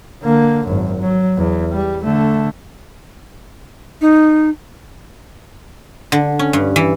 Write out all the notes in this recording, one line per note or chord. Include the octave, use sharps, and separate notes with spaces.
D3 A#3
G#1 F#2
F#3
E2
G3
D3 A3
D#4
D3
C#4
G2
E3